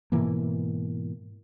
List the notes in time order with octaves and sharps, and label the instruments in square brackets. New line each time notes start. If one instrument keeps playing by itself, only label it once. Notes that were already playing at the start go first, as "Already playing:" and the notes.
[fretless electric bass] G#2 B2 E3 A#3